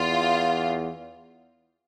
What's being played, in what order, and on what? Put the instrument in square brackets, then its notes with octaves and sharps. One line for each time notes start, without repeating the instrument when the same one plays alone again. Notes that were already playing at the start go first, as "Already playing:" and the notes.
Already playing: [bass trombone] E2 [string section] F4